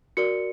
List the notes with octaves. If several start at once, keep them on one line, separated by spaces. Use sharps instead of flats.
F#4 A#4 D5 C#7